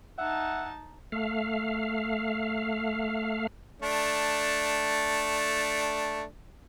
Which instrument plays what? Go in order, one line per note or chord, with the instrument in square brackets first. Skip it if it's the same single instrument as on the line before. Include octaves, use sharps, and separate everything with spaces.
[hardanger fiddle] D#4 A5 [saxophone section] E5 F#5
[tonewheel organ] A3 F5
[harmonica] A3 D4